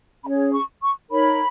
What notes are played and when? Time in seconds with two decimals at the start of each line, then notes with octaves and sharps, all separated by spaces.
0.25 C#4 G#4 C#5 B5
0.52 C#6
0.82 C#6
1.10 D#4 A#4 C#5 B5